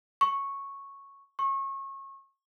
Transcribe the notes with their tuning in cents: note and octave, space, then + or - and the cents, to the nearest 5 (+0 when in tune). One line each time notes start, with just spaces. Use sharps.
C#6 -5
C#6 -30